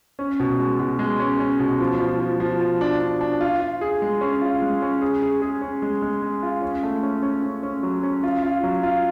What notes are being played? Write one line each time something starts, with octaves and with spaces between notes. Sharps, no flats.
C#4
B2
G#3
B2
G#3
C#4
C#4
B2
F3
F3
F3
F3
F3
D4
D4
D4
F4
F4
G#4
G#3
C#4
F4
G#3
C#4
G#4
G#4
G#4
C#4
G#3
G#3
G#3
F4
C#4
A3
C#4
C#4
C#4
C#4
F#3
C#4
F4
F4
F#3
F4